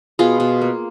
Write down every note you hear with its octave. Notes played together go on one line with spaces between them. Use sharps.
B2 F4 G#4
B2
A#3